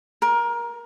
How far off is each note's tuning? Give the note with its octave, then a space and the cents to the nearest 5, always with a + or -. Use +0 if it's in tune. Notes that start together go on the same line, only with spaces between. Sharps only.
A#4 +20